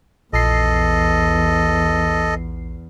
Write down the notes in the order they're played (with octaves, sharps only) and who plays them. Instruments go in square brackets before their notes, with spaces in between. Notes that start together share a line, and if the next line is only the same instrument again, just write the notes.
[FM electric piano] A#1 C7 [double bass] E2 [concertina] A4 D#5